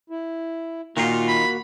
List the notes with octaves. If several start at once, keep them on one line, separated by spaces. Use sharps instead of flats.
E4
A#2 D#3 A#3 D#4 F4 F#4
B5